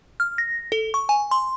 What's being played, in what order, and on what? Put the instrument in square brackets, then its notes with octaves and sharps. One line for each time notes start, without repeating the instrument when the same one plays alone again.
[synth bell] F6
A#6
A4
C#6
G#5
C6